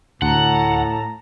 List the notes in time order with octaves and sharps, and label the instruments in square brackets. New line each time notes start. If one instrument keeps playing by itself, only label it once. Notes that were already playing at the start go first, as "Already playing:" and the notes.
[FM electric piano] D2 [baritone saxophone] A2 [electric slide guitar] F#5 [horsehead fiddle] A5 A#5